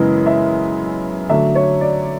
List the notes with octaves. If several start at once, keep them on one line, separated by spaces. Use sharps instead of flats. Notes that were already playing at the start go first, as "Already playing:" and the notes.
Already playing: F#2 C#3 E3 G#3 B3
E5
D3 F#3 A3 E5
C#5
D5